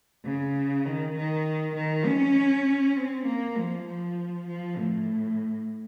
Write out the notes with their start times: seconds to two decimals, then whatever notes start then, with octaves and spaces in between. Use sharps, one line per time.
0.25 C#3
0.86 D#3
1.16 D#3
1.75 D#3
2.06 C#4
2.97 C4
3.26 A#3
3.57 F3
3.87 F3
4.47 F3
4.77 A2